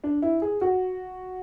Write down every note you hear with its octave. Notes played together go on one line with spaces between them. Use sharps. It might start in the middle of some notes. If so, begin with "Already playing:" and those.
D4
E4
G#4
F#4